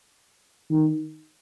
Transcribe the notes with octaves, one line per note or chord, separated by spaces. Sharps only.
D#3